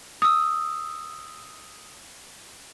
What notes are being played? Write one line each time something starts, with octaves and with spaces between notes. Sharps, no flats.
D#6 E6